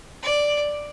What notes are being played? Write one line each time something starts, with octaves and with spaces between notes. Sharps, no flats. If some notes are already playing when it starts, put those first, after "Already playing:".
D5